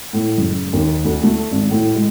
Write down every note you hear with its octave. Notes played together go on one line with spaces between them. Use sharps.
A2
F#1
D#2
D2
A3
G#1
A2
G#3